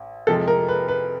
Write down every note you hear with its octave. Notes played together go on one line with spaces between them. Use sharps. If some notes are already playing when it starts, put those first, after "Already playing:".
Already playing: A1
F2 C3 F3 G#3 A4
A#4
B4
B4